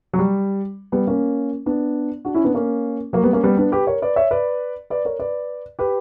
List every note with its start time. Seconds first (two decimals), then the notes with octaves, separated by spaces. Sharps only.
0.13 F#3
0.19 G3
0.92 G3 B3
1.07 A#3 C#4
1.66 B3 D4
2.25 D4 F#4
2.34 C#4 E4
2.44 B3 D4
2.55 A#3 C#4
3.13 F#3 A#3
3.23 G3 B3
3.33 A#3 C#4
3.43 G3 B3
3.57 B3 D4
3.72 G4 B4
3.87 A#4 C#5
4.02 B4 D5
4.16 C#5 E5
4.31 B4 D5
4.90 B4 D5
5.05 A#4 C#5
5.19 B4 D5
5.79 G4 B4